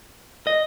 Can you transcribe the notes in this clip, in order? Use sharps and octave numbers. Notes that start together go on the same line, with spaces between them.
D#5